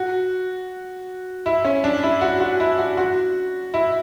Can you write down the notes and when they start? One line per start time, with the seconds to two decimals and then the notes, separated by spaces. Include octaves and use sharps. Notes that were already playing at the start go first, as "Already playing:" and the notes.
Already playing: F#4
1.46 E4
1.65 C#4
1.84 D4
2.03 E4
2.21 F#4
2.40 F#4
2.60 E4
2.78 F#4
2.97 F#4
3.74 E4